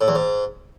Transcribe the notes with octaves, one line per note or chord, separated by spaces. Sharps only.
A2
E2
G#2